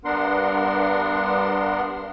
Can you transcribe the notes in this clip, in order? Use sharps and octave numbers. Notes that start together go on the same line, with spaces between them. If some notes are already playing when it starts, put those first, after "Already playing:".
G2 B3 D4 A#4 F#5 C6